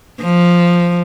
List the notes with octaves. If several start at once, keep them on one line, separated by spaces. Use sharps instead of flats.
F3